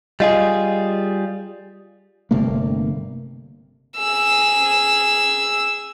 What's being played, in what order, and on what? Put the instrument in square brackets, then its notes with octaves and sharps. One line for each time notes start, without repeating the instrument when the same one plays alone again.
[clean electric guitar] G3 F4 G#4 [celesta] D#5
[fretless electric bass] G1 C3 A3 A#3
[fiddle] G#4 E6